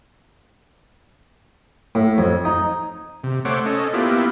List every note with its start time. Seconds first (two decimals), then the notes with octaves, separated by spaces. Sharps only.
1.95 A2
2.18 F2
2.45 D#4
3.24 C3
3.45 A3 C5 C#5 F#5 D6
3.66 C#4 A4 D#5
3.94 A#3 B3 E4 F4 G4